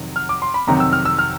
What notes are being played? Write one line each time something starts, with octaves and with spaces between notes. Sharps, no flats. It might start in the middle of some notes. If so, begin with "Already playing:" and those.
Already playing: F2 C3 D#3 F#3
F6
D6
C6
B5
F2 C3 D#3 F#3 A#5
E6
F6
E6
F6